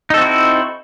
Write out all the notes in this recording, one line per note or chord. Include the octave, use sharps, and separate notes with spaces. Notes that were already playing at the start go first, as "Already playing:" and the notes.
C4 D#4 E4 F#4 A4